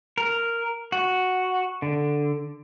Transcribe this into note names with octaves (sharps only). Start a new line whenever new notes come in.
A#4
F#4
D3